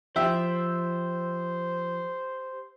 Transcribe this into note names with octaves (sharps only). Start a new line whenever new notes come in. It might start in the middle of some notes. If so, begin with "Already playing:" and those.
F3 G4 C5 E5 G5